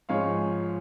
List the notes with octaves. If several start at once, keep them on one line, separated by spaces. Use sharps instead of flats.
G#2 F3 G#3 C#5 F5